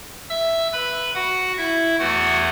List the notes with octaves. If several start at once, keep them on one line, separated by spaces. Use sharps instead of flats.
E5 E6
B4 B5
F#4 F#5
E4 E5
E2 E3 A3 F#4 F#5